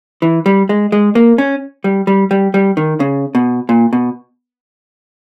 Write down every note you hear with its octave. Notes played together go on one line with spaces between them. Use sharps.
E3
G3
G#3
G#3
A#3
C#4
G3
G3
G3
G3
D#3
C#3
B2
A#2
B2